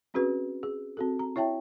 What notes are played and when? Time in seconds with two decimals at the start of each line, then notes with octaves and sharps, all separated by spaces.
0.14 C4 C#4 F#4 G#4 B4
0.63 G#4
0.97 C4 F#4 A4
1.19 A#5
1.36 E4 C#5 E5 G5 A5